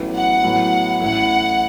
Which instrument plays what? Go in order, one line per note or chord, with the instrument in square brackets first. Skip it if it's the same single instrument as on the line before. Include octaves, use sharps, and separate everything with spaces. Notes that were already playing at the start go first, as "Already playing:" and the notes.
Already playing: [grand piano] A1 A2 F#3 B3 E4
[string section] F#5
[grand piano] A2 F#3 B3 E4
[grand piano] A1 A2 A3 E4 [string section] F#5